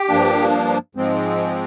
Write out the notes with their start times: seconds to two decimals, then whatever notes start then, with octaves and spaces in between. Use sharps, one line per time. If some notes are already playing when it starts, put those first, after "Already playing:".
Already playing: G4
0.08 G2 F3 A#3 D4
0.95 G#2 F3 G#3 C4